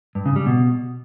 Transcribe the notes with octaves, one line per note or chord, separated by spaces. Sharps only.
G2
C#3
G3
B2